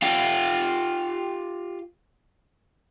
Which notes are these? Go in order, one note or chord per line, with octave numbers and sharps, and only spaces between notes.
F4 G4